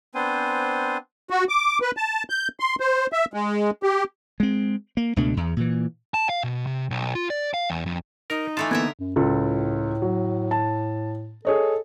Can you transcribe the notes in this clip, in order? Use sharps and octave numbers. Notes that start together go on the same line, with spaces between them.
B3 C4 D4 C5 G#5
F#4
D6
B4
A5
G6
C6
C5
E5
G#3
G4
G#3 C4
A#3
C#2 B2 A3 D4
E2
A#2 E3
A5
F5
B2
C3
B1
F4
D5
F5
E2
F2
D#4 A#4
E3 A3 F4 A5
D3 E3 A#3 B3 A#4 E5 G#6
F#2
C#2 A2 F4 A4
F#3
A5
G#4 A4 C#5 D#5